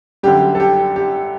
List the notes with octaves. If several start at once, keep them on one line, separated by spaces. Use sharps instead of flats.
F#2 D3 G3 G4
A4
G4
G4